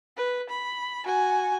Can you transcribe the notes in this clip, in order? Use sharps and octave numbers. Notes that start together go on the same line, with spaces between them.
B4
B5
F#4 G#5